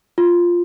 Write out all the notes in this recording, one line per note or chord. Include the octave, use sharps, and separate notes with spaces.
F4